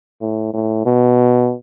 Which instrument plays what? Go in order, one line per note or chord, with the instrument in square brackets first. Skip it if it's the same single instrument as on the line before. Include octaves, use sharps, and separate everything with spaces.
[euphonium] A2
A2
B2